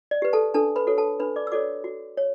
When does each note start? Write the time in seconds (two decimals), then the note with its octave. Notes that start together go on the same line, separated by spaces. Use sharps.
0.11 D5
0.22 G4 B4
0.33 A4 A5
0.54 D4 A4 A5
0.76 B4 B5
0.87 F#4 A4 C#5
0.98 A4 A5
1.20 D4 B4 B5
1.36 D5 D6
1.47 E6
1.52 F#4 A4 C#5 D5 D6
1.84 F#4
2.17 C#5